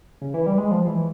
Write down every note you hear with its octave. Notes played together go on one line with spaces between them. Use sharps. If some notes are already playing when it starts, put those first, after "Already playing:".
C#3
E3
G3
G#3
F3
E3